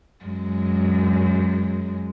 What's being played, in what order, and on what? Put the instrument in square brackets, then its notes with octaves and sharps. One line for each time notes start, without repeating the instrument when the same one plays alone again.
[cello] F#2 G#3